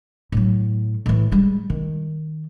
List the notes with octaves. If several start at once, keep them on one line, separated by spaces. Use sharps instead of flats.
A2 F#3
A2 E3
G3 G#3
D#3